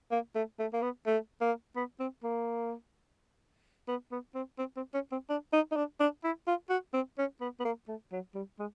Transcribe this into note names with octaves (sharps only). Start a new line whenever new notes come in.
A#3
A3
A3
A#3
B3
A3
A#3
B3
C4
A#3
B3
B3
C4
C4
C4
C#4
C4
D4
D#4
D#4
D4
D4
E4
F4
F#4
C4
C#4
B3
B3
A#3
A3
F#3
G3
G#3